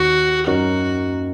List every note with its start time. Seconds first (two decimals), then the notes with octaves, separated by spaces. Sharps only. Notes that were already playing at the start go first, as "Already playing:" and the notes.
Already playing: D#2 D#3 F#4
0.47 F#2 F#3 D#4 F#4 A#4 C#5